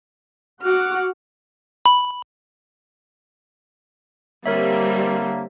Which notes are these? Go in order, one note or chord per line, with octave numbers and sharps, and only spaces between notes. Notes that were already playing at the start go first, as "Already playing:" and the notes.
F#4 F#5 D6 F6
B5
D3 G3 A#3 C4 A#4 C#5 E5